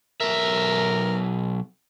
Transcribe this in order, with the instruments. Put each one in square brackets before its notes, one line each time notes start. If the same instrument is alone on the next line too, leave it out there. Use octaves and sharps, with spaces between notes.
[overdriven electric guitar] B1 E5 [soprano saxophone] A#4